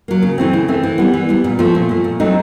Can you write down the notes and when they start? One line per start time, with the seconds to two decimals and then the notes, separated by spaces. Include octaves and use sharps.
0.08 F#3 A#3
0.22 C#3
0.38 E3 A3 C4
0.53 C#3
0.68 E3 A3 C4
0.83 E3
0.98 G3 B3
1.14 E3
1.29 G3 B3
1.44 A#2
1.59 F3 A3
1.75 A#2
1.89 F3 A3
2.04 A#2
2.20 F#3 A3 C4 D#4